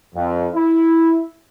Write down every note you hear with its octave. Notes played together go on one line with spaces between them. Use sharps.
F2
E4